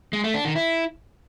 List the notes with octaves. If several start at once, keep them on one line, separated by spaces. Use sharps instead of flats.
G#3
A3
D4
D#3
E4